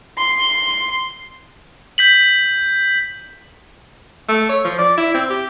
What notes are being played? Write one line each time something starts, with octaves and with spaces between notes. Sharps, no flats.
C6
G6 B6 F#7
A3
C#5
F3
D5
E4
C4
G4